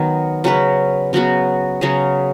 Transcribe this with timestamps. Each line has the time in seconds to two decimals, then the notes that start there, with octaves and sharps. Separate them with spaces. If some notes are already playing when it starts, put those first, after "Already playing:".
Already playing: D#3 F#3 B3
0.44 C#3 F#3 C#4 B4
1.13 C#3 F#3 B3 F#4
1.81 C#3 F#3 C#4 G#4